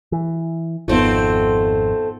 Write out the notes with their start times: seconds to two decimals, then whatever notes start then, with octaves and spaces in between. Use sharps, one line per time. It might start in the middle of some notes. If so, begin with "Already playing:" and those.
0.12 E3
0.88 G#1 F2 A3 B3 C4 D#4 F4